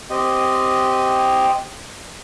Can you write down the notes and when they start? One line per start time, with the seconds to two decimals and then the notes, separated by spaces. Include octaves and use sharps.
0.10 C4 G4 D#5